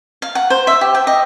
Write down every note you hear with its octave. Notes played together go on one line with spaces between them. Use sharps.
F5
F#5
C5
E5
G4
G5
D#5